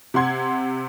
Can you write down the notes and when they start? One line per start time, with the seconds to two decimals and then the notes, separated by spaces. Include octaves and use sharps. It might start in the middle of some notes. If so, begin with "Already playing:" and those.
0.14 C3 F#5 C6 G#6